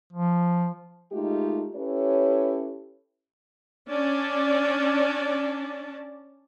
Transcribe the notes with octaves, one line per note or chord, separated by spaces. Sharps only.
F3
G#3 A3 D#4 F4 G4
C#4 E4 G4 A4 B4 C#5
C#4 D4 D5 A5